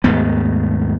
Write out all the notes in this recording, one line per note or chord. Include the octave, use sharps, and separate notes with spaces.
D#2 G#2 A3 B3